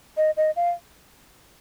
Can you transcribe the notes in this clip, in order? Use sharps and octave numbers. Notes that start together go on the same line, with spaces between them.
D#5
D#5
F5